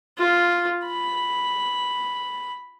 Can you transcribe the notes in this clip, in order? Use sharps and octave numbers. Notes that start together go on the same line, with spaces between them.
F4
B5